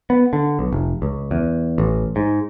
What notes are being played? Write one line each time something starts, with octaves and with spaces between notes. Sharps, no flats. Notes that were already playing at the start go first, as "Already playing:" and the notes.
B3
D3
B1
F1
C#2
E2
A1
G#2